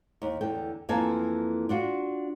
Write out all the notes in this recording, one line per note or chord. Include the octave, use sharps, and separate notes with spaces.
D#2
E2 D3 G5
F2 E3 A#3 G#5 A5
D4 F4 F#4